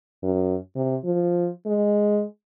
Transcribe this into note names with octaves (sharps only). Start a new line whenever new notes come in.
F#2
C3
F3
G#3